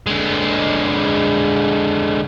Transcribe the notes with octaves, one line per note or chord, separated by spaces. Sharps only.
D3 G#3